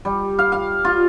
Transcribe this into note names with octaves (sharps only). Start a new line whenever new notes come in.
G3
F5
F5
F4